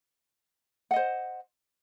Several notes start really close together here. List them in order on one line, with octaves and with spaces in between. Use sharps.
F#5 D#5 C5